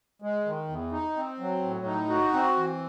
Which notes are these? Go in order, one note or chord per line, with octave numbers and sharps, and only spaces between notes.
G#3
D#3
E2
D#4
C4
F#3
A2
D#4
F#4
C4
E3